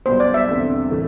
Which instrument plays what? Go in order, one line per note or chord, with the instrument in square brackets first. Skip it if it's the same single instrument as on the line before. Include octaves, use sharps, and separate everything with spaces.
[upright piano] B1 B2 G3 B3 [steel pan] C5
[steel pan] D5
E5
[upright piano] E2 D3 G3 C4
A2 E3 A3